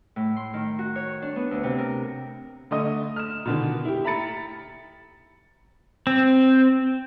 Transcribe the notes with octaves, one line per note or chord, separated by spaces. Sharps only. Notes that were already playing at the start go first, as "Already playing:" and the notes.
A2
C6
D#3
F#4
C#5
D4
B3
D2
C3
A#4
D3 A3 D#5 D#6
F6 E7
B2 D3 D#3
E4 G4
E5 A#5 B5 A6 C#7
C4